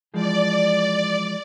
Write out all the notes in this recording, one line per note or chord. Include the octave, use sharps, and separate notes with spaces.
E3 F3 G#3 D5